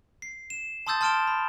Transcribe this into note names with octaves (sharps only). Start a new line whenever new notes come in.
C7
E7
A5 C6 D#6 E6 G6 A6
A5 C6 F6 D7 E7 G7
B5